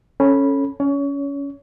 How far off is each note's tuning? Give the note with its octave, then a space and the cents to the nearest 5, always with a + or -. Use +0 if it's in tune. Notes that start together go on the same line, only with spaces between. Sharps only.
C#4 -5 A4 +0 B5 -10
C#4 +20 C#5 +30